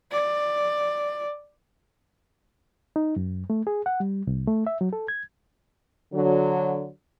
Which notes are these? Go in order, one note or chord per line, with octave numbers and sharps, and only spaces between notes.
D5
D#4
F#2
A3
G#4
F#5
G3
C2
A3
E5
F#3
A4
G#6
D3 F#3